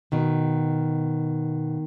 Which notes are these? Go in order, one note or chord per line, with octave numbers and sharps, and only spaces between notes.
B2 D#3